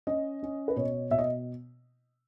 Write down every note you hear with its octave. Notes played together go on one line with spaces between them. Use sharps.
C#4 D#5
C#4
B4
B2 C#5
B2 E5
D#5